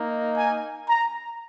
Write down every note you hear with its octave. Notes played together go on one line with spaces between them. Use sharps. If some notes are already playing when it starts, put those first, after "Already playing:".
Already playing: A#3 D#4
G#5
A#5